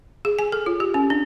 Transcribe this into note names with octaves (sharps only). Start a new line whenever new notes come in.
G#4
G#5
A4
F4
G4
C#4
D4